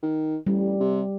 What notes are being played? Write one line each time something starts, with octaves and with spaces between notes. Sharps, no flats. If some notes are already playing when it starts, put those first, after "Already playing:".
D#3
A1 G3
C3